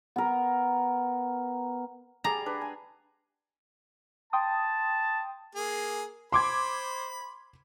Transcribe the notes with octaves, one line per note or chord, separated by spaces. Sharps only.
B3 A#4
G3 G#4 D5 A#5
D4 B4
G#5
G5 A5 C6 D#6
A#3 G#4
C5 B5 C6 D6 G#6